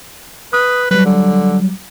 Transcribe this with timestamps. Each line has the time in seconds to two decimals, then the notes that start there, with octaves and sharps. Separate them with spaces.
0.53 B4 D#6
0.91 F#3 G3 B4
1.05 D3